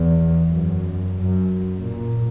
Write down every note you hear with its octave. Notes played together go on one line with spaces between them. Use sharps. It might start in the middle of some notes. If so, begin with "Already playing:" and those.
Already playing: E2
F#2
F#2
A#2